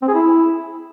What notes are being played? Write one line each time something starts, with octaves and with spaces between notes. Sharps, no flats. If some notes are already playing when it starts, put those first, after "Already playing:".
C4
G#4
E4